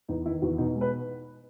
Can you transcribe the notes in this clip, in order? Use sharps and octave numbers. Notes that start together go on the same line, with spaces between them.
E2 D#4
D#3 E4
E2 F#4
B2 D#4
G#3
B4